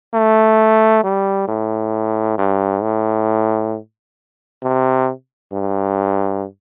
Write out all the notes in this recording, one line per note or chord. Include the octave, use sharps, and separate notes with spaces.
A3
G3
A2
G2
A2
C3
G2